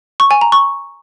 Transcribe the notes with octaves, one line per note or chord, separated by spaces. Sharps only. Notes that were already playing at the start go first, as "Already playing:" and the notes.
C#6
G#5
A#5
C#6